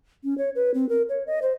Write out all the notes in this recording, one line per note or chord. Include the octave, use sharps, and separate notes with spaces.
C#4
C#5
B4
C4
A#4
C#5
D#5
C5